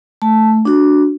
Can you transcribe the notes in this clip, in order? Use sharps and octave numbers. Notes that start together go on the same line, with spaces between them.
A3 A5
D4 F#4